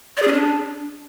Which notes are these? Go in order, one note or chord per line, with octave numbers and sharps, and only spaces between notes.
D5
G#4
C#4
D4